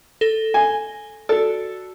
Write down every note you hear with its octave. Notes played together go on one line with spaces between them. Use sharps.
A4 A#6 G7
G#5
F#4 A4 D5